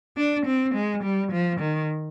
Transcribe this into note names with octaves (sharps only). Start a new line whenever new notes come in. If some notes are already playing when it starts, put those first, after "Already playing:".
D4
C4
G#3
G3
F3
D#3